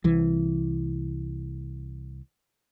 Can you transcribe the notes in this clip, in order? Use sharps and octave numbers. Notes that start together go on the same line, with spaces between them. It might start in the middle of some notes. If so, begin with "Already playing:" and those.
C2 E3